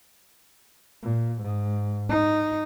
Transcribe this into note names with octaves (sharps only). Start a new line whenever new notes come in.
A#2
G#2
D#4